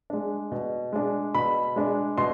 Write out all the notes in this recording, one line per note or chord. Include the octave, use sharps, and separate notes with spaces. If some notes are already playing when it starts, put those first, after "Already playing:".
G#3 D4
B2
G#3 D4
B2 B5
G#3 D4
B2 C6